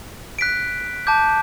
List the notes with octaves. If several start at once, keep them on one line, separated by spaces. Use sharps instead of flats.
F#6 B6 D7
A5 D6 G6